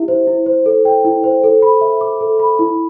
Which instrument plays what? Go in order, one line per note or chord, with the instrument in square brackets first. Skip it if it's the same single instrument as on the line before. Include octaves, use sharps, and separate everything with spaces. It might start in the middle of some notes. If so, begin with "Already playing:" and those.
Already playing: [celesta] E4 G4 E5
C5
E4
C5
A4
G5
E4
C5
A4
B5
E5
D6
A4
B5
E4